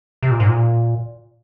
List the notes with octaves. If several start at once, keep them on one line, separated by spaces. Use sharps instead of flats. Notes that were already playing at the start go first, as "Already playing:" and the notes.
C3
A#2
G#2
A#2